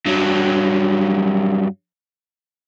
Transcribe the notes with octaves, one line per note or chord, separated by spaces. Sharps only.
G2 F#3